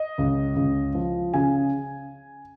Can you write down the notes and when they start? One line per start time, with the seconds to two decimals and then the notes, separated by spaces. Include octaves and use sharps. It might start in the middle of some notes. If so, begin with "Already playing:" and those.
Already playing: D#5
0.18 C#2
0.56 C#2
0.95 F3
1.34 C#3 G#5